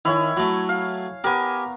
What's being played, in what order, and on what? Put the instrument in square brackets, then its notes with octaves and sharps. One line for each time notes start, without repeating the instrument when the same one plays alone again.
[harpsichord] D#3 [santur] E4 C#5 G#5
[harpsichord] F#3 A3
[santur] F5
[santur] B3 A#4 [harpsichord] G4 G#5